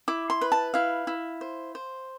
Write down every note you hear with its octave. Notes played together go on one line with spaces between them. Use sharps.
E4 D6
C6
B4
A5
E4 F5
E4
C5
C5